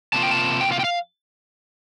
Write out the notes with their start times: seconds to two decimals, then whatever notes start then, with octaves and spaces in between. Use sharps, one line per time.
0.13 C3 G3 A#3 F4 A5
0.23 G5
0.31 A5
0.61 G5
0.72 F5
0.79 G5
0.84 F5